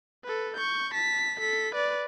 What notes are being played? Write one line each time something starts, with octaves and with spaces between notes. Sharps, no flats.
A4 B4
C#6 G6
A5 B6
A4 B6
B4 D5